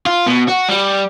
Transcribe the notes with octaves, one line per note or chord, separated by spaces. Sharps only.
F4
B2
F#4
G3